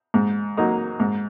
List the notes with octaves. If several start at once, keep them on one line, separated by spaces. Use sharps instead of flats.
G#2
F#3 A#3 D#4
G#2